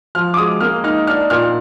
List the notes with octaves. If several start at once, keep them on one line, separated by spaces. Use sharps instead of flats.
F3 F6
D6
G#3 D#6
A#3 F6
D#4 F6
D4 F6
A#2 F6